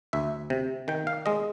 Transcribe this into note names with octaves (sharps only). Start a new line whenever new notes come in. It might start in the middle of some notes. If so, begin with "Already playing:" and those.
D2 E5
C3
D#3 G5
F5
G#3 D#5